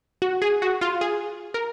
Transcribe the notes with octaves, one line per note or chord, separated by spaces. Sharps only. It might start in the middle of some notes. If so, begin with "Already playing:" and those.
F#4
G#4
F#4
F4
G#4
A#4